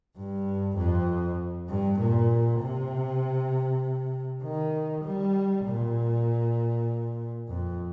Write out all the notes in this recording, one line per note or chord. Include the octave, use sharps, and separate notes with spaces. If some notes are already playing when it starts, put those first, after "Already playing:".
G2
F2
G2
A#2
C3
D#3
G3
A#2
F2